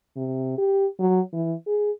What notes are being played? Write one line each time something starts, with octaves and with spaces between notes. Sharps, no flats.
C3
G4
F#3
E3
G#4